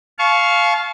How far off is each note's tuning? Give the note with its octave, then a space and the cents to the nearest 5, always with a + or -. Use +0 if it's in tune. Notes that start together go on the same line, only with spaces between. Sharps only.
F5 +0 A5 -40 C#6 +0